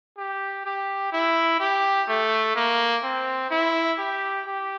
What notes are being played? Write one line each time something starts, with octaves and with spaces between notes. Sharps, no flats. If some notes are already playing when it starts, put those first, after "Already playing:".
G4
G4
E4
G4
A3
A#3
C4
E4
G4
G4